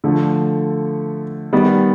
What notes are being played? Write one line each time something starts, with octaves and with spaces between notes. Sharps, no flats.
D3 F3 A3
D#3 G3 B3